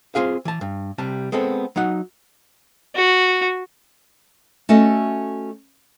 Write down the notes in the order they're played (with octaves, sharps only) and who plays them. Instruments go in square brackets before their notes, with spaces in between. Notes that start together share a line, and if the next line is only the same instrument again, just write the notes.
[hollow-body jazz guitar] C4 F4 G#4 F5
E3 A5
G2
C3 G3 A5
G#3 B3 C4 A4
F#3 D#4 F#5
[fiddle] F#4
[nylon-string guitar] A3 C#4 F#4 A4 D#5